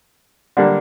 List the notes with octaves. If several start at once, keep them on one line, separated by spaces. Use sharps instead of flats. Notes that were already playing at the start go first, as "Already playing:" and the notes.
D3 G3 A#3 D4